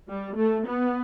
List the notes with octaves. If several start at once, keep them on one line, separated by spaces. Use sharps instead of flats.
G3
A3
B3